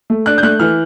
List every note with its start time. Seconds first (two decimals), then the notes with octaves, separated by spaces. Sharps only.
0.10 A3
0.26 D4 F#6
0.38 G6
0.43 A3 F#6
0.60 E3 F6